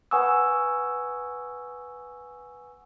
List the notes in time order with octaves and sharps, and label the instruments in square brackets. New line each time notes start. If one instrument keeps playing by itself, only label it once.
[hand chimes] B4 F#5 G#5 C#6 D#6 E6